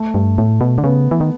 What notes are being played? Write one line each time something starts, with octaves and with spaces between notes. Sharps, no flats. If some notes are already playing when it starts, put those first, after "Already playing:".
Already playing: A3
G2
A2 A3
B2
D3
C#3 B3
E3
D#3